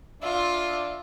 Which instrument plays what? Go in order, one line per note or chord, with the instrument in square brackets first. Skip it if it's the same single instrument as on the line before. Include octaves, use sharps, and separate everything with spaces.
[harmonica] D4 E5 E6 [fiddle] F4